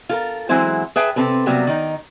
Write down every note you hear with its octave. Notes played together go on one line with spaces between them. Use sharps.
F4 A4 A#4
E3 F#3 G#3 C4 E4 C5
G#4 B4 E5 G5 A5
C3 C4 A4 B4
C3 F#3 G3 A#3 B3
D#3 D#4